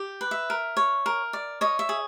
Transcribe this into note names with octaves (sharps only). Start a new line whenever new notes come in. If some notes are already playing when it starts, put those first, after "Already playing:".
Already playing: G4
B4
E5
A#4
C#5
A#4
D5
C#5 D#5
E5
G#4